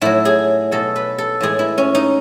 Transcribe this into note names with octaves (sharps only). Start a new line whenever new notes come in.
A2 F#3 E4
G#4
B2 F#3 A4
B4
A4
A2 E3 G#3 G#4
E4
C#4
D#4